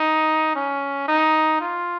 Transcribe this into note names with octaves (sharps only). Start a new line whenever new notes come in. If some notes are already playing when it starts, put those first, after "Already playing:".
Already playing: D#4
C#4
D#4
F4